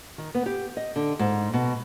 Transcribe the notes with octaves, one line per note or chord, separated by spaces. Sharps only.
D#3
B3
G4
D#5
D3
G#2
B2